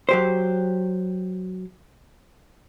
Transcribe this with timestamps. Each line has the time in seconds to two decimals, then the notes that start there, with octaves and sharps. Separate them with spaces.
0.09 F#3 G4 C5